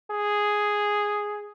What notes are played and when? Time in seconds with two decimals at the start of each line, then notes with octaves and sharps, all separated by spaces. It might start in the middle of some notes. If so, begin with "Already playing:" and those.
0.11 G#4